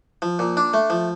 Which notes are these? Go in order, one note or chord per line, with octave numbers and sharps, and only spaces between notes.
F3
A#2
D4
A3
F3